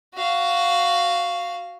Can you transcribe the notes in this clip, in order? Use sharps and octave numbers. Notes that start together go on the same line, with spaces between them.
F#4 F5